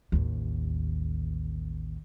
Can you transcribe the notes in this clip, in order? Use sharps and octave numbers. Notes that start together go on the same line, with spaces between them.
A1 D#2